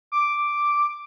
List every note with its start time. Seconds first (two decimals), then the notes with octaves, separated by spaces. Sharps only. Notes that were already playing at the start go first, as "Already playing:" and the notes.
0.12 D6